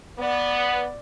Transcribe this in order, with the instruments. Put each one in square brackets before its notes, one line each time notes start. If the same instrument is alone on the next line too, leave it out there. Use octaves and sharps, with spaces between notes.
[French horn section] B3 [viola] D5